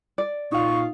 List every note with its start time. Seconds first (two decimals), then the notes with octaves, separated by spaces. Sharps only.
0.18 D5
0.52 A#2 D#4 F4 F5 C#6